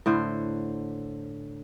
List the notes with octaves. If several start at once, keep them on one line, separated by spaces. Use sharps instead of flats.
A2 D3 C5